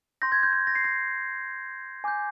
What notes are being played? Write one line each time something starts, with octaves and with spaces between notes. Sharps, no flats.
C6 G6 A#6
G#6
G6
G#6
A#6
C7
A#6
G#5 D6 G6